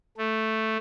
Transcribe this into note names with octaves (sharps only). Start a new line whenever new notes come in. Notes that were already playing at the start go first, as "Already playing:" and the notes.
A3